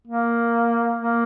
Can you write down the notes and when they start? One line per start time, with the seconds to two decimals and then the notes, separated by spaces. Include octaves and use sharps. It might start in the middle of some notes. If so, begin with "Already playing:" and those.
0.08 A#3
0.98 A#3